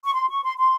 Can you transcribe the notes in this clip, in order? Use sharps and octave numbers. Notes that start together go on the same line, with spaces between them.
C#6
C6
C#6
C6
C6